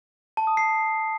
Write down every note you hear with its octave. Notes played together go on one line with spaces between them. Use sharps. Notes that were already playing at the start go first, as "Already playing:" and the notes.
A5
D#6
C7